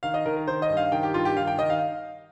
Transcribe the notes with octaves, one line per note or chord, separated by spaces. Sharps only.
D#3 F5
D#5
D#3 A#4
A#4
D#3 C5
D#5
G2
F5
D#3 G5
G4
G2 F4
G4
D#3 F5
G5
D#3 D#5
F5